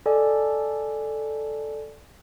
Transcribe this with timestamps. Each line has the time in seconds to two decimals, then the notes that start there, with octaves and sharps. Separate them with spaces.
0.06 A4 D5 D#5 G#5 A5